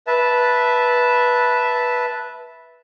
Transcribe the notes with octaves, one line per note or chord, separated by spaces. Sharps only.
B4 E5 A5